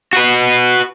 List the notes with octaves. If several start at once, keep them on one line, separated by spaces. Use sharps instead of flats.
F#4 B4